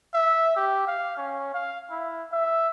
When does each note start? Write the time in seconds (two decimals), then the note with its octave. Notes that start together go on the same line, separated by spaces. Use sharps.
0.14 E5
0.56 G4
0.87 F5
1.17 C#4
1.54 F5
1.91 E4
2.32 E5